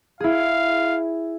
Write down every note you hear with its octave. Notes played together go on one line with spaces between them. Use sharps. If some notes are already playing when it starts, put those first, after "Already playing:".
E4 G#4 F5